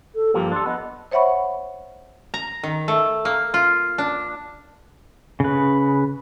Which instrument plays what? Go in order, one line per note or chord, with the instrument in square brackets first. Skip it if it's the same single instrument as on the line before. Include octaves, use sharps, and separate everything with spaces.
[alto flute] A4
[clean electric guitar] G2 F3 A#3 [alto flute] G4
[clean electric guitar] D4 A4 [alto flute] C6
[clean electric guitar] B3 [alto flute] D#5
[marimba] C5 C#5 E5 F#5 B5 C#6
[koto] A#5
D#3
A3
A#3
F4
D4
[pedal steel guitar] C#3 B4